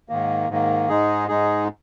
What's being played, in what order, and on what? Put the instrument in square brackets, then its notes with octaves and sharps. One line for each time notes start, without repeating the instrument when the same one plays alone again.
[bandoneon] G#2 D#3 A#3
G#2 D#3 A#3
G#2 G#3 D#4 G#4
G#2 G#3 D#4 G#4